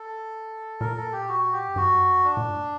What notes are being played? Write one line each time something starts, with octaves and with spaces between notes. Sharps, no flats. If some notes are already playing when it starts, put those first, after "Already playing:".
Already playing: A4
A#2 A#4
A4
G4
F#4
G4
F#2
G2 F#4
F#2
D4
A#2
G2